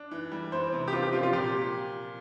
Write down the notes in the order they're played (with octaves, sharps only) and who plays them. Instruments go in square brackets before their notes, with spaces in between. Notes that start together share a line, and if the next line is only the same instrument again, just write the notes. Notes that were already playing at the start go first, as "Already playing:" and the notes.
Already playing: [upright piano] D4
E3
G3
[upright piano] E3 [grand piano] C5
[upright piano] C3
[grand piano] G4
[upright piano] C4 [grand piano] F4
[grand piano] G4
[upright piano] F3 [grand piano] F4
[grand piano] F4
[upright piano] A#2 [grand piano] G4